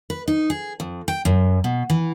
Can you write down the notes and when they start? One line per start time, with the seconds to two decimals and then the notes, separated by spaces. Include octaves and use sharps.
0.10 B4
0.28 D#4
0.50 G#4
0.80 F2
1.08 G5
1.25 F#2
1.64 B2
1.90 E3